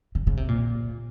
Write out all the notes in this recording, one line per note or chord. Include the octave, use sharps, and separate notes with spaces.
C#3
C#3
C3
A#2